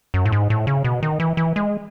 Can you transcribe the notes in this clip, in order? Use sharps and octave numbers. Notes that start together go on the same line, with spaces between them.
F#2
A2
G#2
A2
C#3
B2
D#3
E3
E3
G#3